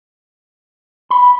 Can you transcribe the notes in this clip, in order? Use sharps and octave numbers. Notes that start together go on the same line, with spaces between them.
B5